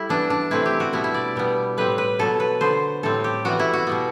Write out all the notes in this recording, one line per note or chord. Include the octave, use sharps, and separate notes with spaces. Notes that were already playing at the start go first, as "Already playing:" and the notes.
Already playing: G3 E4 A4
E3 B3 D4
D4
C3 E3 A3 C4 E4
G4
F#4
B2 G3 B3 E4
E4
D5
B2 G3 B3
A2 G3 C4 B4
B4
B2 F#3 B3 A4
B4
D3 F#3 B3 C5
A2 G3 C4 A4
G4
E3 G3 B3 F#4
E4
F#4
B2 G3 B3